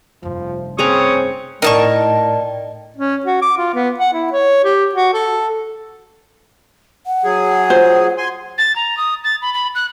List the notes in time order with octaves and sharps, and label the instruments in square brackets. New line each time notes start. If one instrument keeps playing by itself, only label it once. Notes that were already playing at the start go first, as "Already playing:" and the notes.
[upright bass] F1 G2 [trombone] F3
[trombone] C4 [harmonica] C#4 C#5 D#6 [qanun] G#4 B4 A#5
[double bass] A2 [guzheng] D#4 [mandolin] A#4 A5 C#6 [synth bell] D5 D#5 G5
[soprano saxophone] C#4
F#4
D6
F4
B3
F#5
E4
C#5
G4
F#4
A4
[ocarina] F#5
[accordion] F#3 G#4
[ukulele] F4 C5
[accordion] G#5 C6
[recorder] A6
A#5
D#6
A6
B5
B5
F#6